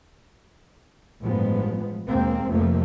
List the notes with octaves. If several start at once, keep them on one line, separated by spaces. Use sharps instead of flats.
A1 G2 F3 G#3 B3
D#2 B2 G#3 A#3 C4
F1 F2 F3 A3 A#3